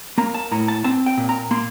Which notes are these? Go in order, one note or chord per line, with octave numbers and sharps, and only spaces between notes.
A#3 A#5
A5
A2 A#5
A5
C4 A5
G5
A#2
A#5
A#3 C6